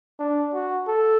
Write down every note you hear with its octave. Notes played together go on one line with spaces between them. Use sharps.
D4
F#4
A4